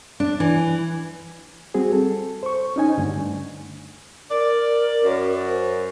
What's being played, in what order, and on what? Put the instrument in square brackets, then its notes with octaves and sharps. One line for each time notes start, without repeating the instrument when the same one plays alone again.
[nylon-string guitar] D4
E3
[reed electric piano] G3 C4 F#4 G#4
A4
C5 C#6
C#4 D#4 G#5
G2 D3 A3
[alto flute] A#4 [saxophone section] D5
[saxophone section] F#2
[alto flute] C5